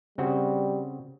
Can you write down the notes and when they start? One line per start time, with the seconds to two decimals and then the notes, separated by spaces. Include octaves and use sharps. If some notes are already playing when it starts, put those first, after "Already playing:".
0.18 C#3 G3 C4 F#4